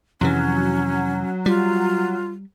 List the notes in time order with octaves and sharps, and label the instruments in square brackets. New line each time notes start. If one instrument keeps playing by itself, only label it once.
[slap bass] F2 C3 E3 [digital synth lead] F#3 [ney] C#4
[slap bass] G3 [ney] F4